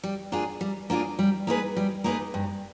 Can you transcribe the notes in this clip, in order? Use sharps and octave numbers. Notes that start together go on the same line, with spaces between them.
G3
A#3 D4 F4 G#4
G3
A#3 D4 F4 G#4
G3
A#3 D#4 G#4 B4
G3
A#3 D#4 G#4 B4
G2